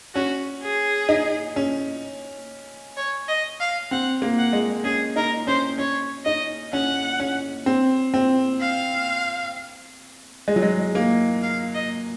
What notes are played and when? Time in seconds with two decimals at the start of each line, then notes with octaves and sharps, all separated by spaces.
0.15 C#4 F#4
0.62 G#4
1.09 D#4
1.56 C#4
2.97 C#5
3.28 D#5
3.60 F5
3.91 C4 F#5
4.22 A#3
4.38 F#5
4.53 G#3
4.84 C#4 G#4
5.16 D#4 A#4
5.47 C#4 C5
5.78 C#4 C#5
6.25 D#4 D#5
6.73 C#4 F#5
7.20 C#4
7.66 C4
8.14 C4
8.60 F5
10.48 G#3
10.56 F#3
10.62 G#3
10.95 A#3
11.42 F5
11.74 D#5